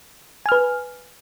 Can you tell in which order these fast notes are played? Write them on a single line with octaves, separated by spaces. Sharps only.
G#5 F6 B4